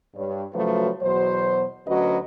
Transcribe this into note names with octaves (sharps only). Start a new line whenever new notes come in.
G2 G3 C#5
C#3 F3 F#3 A3 F#4 B4
E2 B2 F#3 C5
D2 F#3 C#4 F#4 B4 D#5